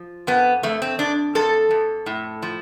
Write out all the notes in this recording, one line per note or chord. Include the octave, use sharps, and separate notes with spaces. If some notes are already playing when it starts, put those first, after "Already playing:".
Already playing: F3
F2 B3
F2 A3
C4
F2 D4
F2 A4
F2
A2
F3